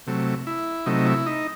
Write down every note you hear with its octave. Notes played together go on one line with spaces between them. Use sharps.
C3 F#3 A3
E4
C3 F#3 A3 D#4
E4
D#4